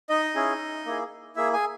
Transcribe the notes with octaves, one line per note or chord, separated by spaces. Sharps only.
D#4 D#5
C#4 E4 G#4
A#3 E4 G#4
A#3 E4 G#4 E5
G#4 G#5